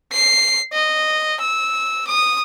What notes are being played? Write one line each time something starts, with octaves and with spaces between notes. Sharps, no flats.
C7
D#5
E6
D#6